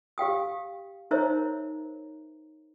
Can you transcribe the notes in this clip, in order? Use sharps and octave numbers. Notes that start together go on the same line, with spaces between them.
G4 F5 G5 D#6
D#4 A#4 C5 C#5 E5 A#5